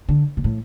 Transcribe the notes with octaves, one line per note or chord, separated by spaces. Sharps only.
D3
B2
A2